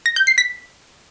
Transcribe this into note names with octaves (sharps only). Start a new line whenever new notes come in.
A#6
G6
C7
B6